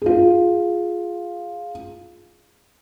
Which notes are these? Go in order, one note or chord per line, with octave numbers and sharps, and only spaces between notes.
F4 G#4